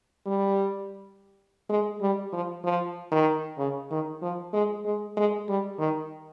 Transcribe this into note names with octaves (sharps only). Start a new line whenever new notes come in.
G3
G#3
G3
F3
F3
D#3
C#3
D#3
F3
G#3
G#3
G#3
G3
D#3